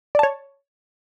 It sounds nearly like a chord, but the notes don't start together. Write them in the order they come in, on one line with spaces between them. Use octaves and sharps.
D5 A5 C#5